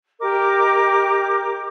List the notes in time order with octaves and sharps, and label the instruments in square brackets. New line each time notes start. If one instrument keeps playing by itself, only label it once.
[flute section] G4 A#4 D#5 D6